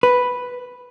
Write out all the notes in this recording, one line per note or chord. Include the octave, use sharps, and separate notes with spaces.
B4